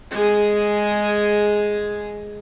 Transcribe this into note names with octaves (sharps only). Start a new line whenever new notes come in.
G#3 G#4